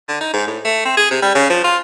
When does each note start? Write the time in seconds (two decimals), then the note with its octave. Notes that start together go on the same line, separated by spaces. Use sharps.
0.09 D3
0.21 D#4
0.33 G#2
0.47 A2
0.65 A3
0.85 C4
0.97 G#4
1.11 C3
1.22 G3
1.35 C#3
1.50 F3
1.64 F4